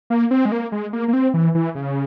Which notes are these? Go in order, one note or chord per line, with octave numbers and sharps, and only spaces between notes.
A#3
C4
G#3
A#3
G#3
A#3
A#3
C4
E3
E3
C#3